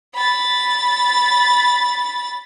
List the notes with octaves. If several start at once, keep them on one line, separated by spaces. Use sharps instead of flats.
B5 A6